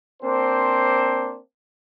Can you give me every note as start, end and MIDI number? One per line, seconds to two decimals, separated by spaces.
0.22 1.38 58
0.22 1.38 60
0.22 1.38 62
0.22 1.38 72